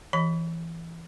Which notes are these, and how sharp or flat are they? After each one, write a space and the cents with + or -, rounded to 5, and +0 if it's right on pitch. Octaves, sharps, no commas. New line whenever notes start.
E3 +15 D#5 +0 B5 +0